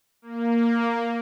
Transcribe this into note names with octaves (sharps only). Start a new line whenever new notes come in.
A#3